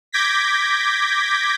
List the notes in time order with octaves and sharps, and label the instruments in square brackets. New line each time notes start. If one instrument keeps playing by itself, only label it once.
[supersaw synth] D6 G6 G#6 A#6 B6